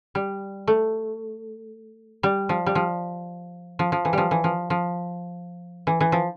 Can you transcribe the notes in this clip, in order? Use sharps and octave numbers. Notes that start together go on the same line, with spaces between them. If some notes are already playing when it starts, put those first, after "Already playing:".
G3
A3
G3
F3
G3
F3
F3
F3
E3
F3 G3
E3
F3
F3
E3
E3
F3